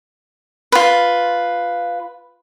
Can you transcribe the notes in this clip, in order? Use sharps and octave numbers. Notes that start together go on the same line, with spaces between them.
F4 B4